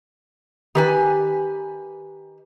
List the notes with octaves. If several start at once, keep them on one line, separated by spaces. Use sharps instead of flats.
D#3 G4 B4 G#5 D6